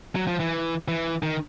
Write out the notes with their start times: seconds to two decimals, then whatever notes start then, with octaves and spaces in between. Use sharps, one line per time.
0.15 F#3
0.27 F3
0.40 E3
0.88 E3
1.23 D#3